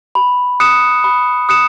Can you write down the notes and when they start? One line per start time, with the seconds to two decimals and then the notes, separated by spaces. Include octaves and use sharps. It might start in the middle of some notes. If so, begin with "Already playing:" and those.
0.15 B5
0.60 D#6 F#6 C#7 E7
1.04 B5
1.49 D#6 F#6 C#7 E7